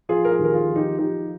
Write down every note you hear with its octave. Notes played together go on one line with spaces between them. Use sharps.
F3 F4 G#4
A#4
F4 G#4
D#2
A#4
F4 G#4
F3
D#4 G4
F3 D#4 G4